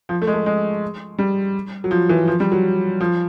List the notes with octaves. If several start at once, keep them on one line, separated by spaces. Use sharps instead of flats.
F3
A3
G#3
A3
G#3
G3
F#3
F3
E3
F3
G3
F#3
F3